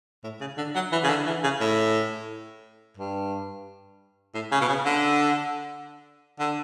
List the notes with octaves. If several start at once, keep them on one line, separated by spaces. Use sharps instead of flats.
A2
C#3
D3
F#3
E3
C#3
D3
E3
C#3
A2
G2
A2
C#3
B2
C#3
D3
D3